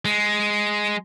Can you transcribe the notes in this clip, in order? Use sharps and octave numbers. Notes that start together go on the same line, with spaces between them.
G#3